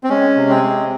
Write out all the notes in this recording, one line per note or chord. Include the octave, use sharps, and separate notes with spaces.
C4
G#3 C#4
C3
C4
G#3